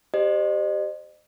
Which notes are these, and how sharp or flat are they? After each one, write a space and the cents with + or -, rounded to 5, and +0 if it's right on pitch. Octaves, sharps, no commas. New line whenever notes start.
G4 +0 C5 +0 D#5 -40